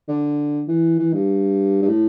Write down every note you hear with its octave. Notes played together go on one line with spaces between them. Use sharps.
D3
E3
E3
G2
G2
A2